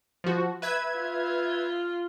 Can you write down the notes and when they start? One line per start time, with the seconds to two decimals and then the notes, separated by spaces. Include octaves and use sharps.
0.24 F3 F#4
0.62 B4 E5 G#6
0.97 F4